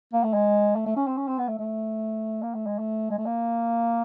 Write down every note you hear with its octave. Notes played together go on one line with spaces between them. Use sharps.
A#3
A3
G#3
A3
A3
C#4
C4
C#4
C4
B3
A3
A3
A#3
A3
G#3
A3
G#3
A3
A#3